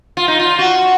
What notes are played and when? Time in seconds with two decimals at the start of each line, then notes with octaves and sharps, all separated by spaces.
0.17 F4
0.28 D#4
0.39 F4
0.59 F#4